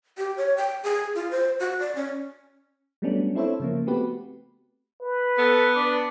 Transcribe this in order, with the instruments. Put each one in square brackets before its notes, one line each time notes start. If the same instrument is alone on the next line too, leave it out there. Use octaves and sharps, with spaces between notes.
[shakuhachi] G4
C#5
G5
G#4
F4
C5
F#4
D5
C#4
[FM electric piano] F#3 G3 A3 B3 C#4 D4
C4 E4 A4 C5 C#5 E5
C#3 F3 A#3
A3 B3 C4 F#4 G4 B4
[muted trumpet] B4
[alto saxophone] B3 [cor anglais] A4
[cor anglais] D4